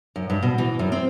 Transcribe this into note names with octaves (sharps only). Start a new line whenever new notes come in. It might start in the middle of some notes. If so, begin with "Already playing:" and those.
F#2
G2
B2
E3
F#2
C4